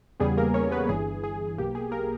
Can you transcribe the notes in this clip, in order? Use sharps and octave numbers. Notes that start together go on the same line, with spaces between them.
E2 C#3 G3 B3 G#4
A#3 A#4
C#4 C#5
B3 B4
G1 G2 E3 G#4
G#4
G#4
B1 B2 A#3 G4
G#4
A#3 A#4